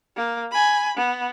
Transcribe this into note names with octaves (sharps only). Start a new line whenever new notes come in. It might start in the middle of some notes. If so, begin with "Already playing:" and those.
A#3
G#5 B5
B3